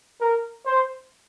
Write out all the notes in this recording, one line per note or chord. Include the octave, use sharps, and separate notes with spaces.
A#4
C5